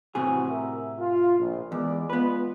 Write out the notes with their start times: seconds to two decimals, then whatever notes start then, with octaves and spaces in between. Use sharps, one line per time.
0.15 A2 C3 E3 C4 F#4 G#4
0.49 A#4 E5
0.99 F4
1.38 A#1
1.72 E2 G#3 B3 D5
2.10 G#3 B3 F4 B4